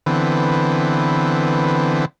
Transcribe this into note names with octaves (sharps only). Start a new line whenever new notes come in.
D3 E3 B3 C4